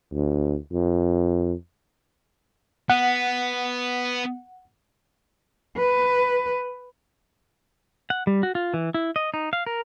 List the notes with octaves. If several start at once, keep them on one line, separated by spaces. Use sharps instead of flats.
D2
F2
B3 F#5
B4
F#5
G3
F#4
F4
E3
E4
D#5
D#4
F5
A#4